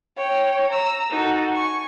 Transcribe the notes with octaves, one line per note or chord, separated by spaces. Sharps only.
C#5 G5
A#5 E6
D#4 F#4 A4
G#5 C#6